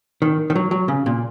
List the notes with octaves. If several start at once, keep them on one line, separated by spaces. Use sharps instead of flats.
D#3
D#3
F#3
F#3
C#3
A#2